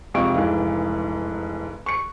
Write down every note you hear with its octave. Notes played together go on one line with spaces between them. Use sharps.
F2 G#2 C3 F5 C#6 D7
F1 G#2 E3 F5
C#6 C#7